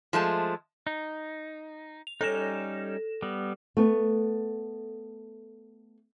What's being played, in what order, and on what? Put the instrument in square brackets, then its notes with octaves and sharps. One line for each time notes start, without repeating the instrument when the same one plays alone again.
[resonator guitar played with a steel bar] F3 G#3 A3 A5
[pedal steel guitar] D#4
[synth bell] F7
[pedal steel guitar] G3 C#4 D#4 [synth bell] A4 A#6 E7
[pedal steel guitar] G3 B3
[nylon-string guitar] A3 B3